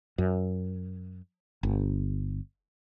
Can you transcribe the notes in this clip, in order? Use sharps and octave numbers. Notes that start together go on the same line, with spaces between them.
F#2
G1